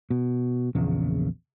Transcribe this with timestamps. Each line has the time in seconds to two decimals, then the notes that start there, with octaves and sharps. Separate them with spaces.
0.10 B2
0.75 A#1 E2 C#3